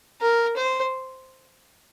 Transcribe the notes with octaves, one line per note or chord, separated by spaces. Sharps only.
A#4
C5